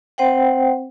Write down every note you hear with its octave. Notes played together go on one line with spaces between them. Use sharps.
C4 C5 F#5 G5